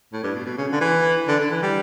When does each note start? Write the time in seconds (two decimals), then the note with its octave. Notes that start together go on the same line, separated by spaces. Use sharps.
0.13 A2
0.23 G2
0.35 B2
0.46 B2
0.57 C#3
0.72 D3
0.81 E3
1.27 D3
1.39 D3
1.51 E3
1.63 G3